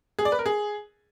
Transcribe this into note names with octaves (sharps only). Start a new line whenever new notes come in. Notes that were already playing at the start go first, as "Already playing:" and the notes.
G#4
D5
B4
A#4
G#4